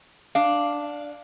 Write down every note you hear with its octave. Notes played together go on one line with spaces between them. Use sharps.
D4 F5